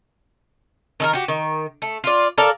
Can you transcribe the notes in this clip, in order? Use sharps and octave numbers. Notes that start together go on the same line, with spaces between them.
D#3 A4 A#4
F#4 G4
D#3
A3
F4 D5
A4 A#4 D5 F5